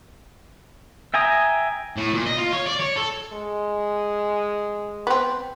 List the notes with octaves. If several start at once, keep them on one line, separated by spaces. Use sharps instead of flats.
E5 G5 G#5 A#5 D#6
A2
A#2
D#5
F4
C#5
D5
C#5
A4
G#3
B3 C4